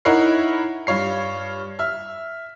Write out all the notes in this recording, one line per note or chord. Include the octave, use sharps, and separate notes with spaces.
D#4 E4 A#4 C#5 F#5 C7
G2 F4 C#5 C7
E5 F6